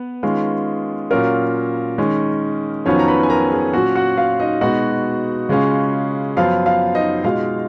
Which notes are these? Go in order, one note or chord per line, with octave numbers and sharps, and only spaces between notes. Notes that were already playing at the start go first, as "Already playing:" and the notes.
Already playing: B3 B4
D#3 G#3 C#4 F4
A#2 F#3 C#4 F4 A#4
D#3 G#3 C#4
F2 D#3 F#3 B3 C#4 F4 C#5
A#5
B4 B5
G#5
A#4 A#5
G#4 G#5
A#2 F#3 C#4 F4 F#4 F#5
F#4 F#5
F4 F5
D#4 D#5
B2 G#3 B3 D#4 F#4 F#5
C#3 G#3 C#4 F4
F#2 F3 B3 F4 F5
F4 F5
D#4 D#5
B2 G#3 D#4 F4 F5